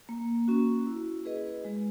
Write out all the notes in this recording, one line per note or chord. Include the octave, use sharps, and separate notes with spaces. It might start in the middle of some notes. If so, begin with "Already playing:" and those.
A#3
C#4 F#4
E4
G#4 B4 D#5
G#3